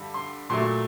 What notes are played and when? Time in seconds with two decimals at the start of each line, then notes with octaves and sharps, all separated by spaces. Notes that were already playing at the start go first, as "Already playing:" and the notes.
Already playing: G2 D3 G3
0.14 C6
0.50 A#2 F#3 A3 C6